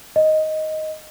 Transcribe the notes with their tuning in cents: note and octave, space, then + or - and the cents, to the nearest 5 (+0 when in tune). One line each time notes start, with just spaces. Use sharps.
D#5 +5